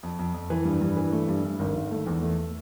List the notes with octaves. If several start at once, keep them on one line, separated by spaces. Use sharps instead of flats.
F2
F2
F2
E3
G2
G2
E3
A3
G2
G2
G#1
G#1
A3
E2
A3